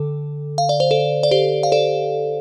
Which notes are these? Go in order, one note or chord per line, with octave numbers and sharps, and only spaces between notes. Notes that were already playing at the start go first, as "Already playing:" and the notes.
Already playing: D3 A4
F5
D5
C5
A4
D5
G4 C5
F5
A4 D5